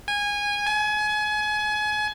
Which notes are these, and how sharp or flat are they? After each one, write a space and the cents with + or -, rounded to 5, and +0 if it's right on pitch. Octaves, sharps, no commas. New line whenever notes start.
G#5 -20
G#5 +30